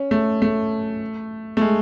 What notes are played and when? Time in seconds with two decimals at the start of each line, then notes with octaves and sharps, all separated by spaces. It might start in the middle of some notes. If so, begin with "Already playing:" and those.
Already playing: C#4
0.11 A3
0.42 A3
1.57 A3
1.61 G#3